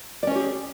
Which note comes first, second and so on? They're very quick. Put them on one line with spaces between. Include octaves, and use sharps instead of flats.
D5 C#4 C#5 G4 G#4